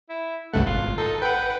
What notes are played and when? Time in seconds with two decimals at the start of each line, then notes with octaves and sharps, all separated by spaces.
0.09 E4
0.54 C#2 G2 A3 F#5
0.66 G#1 F4
0.98 D#4 A4
1.22 B4 F#5 G5